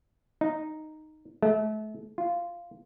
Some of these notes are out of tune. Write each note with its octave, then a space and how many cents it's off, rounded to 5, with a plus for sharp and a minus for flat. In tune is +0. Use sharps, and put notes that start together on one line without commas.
D#4 -5
A3 -35
F4 -10